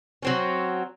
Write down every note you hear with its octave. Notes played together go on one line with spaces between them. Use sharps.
F#3 C4 C#4